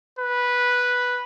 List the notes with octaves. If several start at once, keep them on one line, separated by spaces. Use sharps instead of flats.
B4